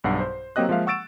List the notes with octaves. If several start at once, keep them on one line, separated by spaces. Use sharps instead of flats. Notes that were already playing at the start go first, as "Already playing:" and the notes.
B1 G2 F#5 C7
C5
F#3 A#3 C4 G4 D#5 F#6
F3 G#3 A#3 E5 F5
F#5 C#6 E6 A6 D7 E7